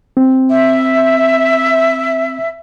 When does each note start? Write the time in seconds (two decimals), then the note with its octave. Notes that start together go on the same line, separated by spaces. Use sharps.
0.17 C4
0.50 E5